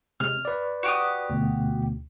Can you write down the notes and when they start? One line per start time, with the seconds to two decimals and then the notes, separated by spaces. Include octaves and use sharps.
0.20 C3 G#3 F6
0.45 B4 D5
0.83 F#4 G4 D#6
1.30 D2 B2